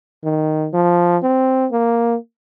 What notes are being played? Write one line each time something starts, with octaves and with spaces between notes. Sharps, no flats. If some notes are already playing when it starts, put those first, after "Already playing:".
D#3
F3
C4
A#3